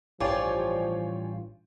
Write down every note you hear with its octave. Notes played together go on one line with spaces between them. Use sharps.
A1 G2 F3 F4 C#5 D5 G5 G#5